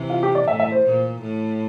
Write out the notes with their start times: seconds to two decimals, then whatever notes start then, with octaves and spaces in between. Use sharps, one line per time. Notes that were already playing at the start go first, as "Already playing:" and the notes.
Already playing: C3 E3
0.10 F4
0.23 G4
0.35 D5
0.47 A2 E5
0.60 E5
0.72 C5
0.85 A#2
1.22 A2